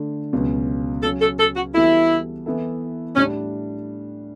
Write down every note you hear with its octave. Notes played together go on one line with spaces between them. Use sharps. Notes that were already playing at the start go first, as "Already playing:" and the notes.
Already playing: D3 A3 D4
C#2 B2 F#3 C#4
C#3 F#3 C#4 A4
A4
A4
F#4
E3 G3 B3 E4 F#4 A4
E3 B3 E4 A4
A2 G3 C#4 D4